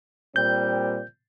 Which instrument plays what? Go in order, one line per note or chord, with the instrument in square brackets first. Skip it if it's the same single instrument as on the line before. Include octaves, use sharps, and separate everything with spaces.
[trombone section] A#2 G3 C4 [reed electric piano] G6